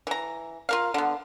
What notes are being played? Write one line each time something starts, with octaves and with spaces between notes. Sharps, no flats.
E3 A#5
F4 A#4 F5
D3 B3